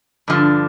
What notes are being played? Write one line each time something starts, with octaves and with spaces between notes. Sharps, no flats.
G2 D3 F3